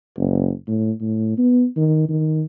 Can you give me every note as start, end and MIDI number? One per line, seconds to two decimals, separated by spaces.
0.17 0.51 30
0.67 0.91 45
1.02 1.35 45
1.38 1.65 59
1.77 2.04 51
2.09 2.44 51